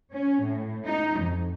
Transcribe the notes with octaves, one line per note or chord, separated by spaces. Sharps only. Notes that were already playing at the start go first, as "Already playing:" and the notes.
C#4
A2
D#4
F2